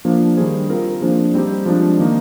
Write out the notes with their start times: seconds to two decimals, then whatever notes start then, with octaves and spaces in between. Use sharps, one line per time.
0.05 F3 A#3 D4
0.37 D#3 G3 D4 G#4 C5
0.69 C4 F4 A#4 F5
1.02 F3 A#3 D4 G#4 C5
1.34 G3 C4 D#4 G4
1.66 F3 G#3 D4
1.99 D#3 A#3 D#4